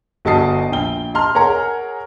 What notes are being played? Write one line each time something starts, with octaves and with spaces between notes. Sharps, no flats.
G1 F#4 D#5 A5 D#6 C7
A#1 G5 G7
D#5 A5 A#5 C6 F6
G#4 A#4 C#5 F#5 A#5